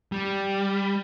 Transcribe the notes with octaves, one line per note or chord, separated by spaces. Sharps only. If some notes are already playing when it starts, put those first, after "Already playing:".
G3